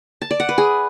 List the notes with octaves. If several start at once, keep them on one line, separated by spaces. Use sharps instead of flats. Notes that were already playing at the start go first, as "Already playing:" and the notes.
A5
D5
F#5
B4
G#4